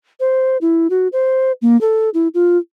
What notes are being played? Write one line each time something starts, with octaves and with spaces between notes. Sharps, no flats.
C5
E4
F#4
C5
A#3
A4
E4
F4